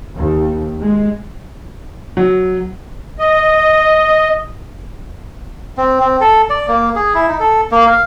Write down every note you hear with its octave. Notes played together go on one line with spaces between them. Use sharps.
D#2
G#3
F#3
D#5
C4
C4
A4
D5
A#3
G#4
E4
D#4
A4
A#3
F5